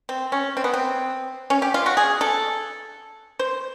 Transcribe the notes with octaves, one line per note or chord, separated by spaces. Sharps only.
C4
C#4
C4
B3
C4
C#4
G4
F4
F#4
G#4
A4
C5